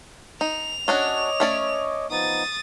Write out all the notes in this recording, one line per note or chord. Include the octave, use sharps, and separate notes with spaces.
D#4 F7
C#4 D4 F#4 C#5 D#5 D6
A3 C#4 D5
F3 B3 D#4 D#6 A6